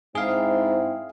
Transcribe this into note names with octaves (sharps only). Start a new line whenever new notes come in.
G#2 C4 E4 G#4 F5